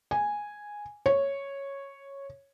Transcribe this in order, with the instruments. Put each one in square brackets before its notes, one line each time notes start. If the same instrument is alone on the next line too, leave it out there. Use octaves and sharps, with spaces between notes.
[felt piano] G#5
C#5